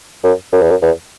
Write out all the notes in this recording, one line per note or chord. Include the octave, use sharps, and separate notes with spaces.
F#2
F#2
E2
F#2
E2